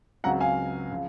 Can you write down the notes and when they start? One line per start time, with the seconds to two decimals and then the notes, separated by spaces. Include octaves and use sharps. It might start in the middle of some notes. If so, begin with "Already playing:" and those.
0.24 C#2 C#3 F#3 C4 F#5 A#5
0.40 F5 G#5
0.91 C#3 F3